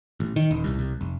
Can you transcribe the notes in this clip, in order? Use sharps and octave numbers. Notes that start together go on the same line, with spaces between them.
A1
D#3
D#1
C2
C2
F1